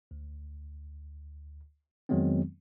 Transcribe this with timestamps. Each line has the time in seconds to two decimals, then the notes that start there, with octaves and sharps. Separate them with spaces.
0.11 D2
2.09 F2 D#3 F#3 G#3 B3 C4